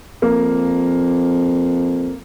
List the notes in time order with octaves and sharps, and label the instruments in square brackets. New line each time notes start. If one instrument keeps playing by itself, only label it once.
[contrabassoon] F2 [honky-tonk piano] A#3